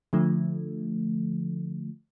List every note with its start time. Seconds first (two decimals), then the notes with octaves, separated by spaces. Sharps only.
0.13 D3 F3 A3